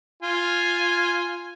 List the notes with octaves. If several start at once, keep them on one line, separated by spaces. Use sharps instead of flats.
F4 G#5